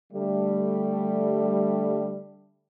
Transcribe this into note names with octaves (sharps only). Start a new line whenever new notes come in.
D3 G3 A3